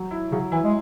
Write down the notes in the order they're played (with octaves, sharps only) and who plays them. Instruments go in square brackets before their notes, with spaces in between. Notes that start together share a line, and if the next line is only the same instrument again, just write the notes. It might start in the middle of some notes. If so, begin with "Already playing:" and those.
Already playing: [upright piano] F#3
E4
[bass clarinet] C#3 [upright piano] F#3
[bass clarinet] E3 [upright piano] E4
[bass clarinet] G#3